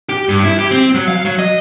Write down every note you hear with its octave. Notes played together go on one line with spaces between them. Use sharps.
G4
G2
E4
G4
C4
F#3
F5
F#3
D#5